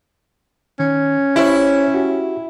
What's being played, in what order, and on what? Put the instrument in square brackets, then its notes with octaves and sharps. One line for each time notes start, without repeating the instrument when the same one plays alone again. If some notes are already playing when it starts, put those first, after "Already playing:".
[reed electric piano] D#3 [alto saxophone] C#4
[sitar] E4 [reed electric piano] G4 C5 C#5
[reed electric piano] F#4 G4